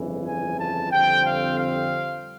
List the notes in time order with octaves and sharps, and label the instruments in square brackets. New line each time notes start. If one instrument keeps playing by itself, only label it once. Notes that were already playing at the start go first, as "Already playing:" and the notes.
Already playing: [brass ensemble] G1 F2 C#3 E3
G#5
A5
F2 D3 G3 C4 G5
F5
F5